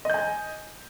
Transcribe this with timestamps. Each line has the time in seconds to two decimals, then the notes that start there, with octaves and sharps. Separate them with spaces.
0.05 D#5
0.10 G6
0.14 G#5